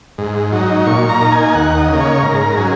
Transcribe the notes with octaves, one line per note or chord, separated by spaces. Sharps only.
G#2
F#3 D#4
A#2 C#6
A#5
A#3 D#4
G#5
D#2 F#5
D#5
C#3 A#3
C#5
G#2 A#4
F#3 C#4 G#4